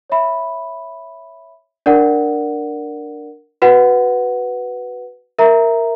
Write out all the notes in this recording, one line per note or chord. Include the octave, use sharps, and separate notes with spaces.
C#5 E5 B5
D4 A#4 D5 F#5
F#4 B4 F#5
A#4 E5 A#5